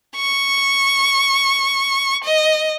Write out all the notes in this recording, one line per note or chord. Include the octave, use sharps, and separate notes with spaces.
C#6
D#5